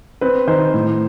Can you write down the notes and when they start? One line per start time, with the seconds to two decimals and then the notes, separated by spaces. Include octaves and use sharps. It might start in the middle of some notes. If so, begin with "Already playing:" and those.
0.21 C4 B4
0.47 D#3 C5
0.74 A2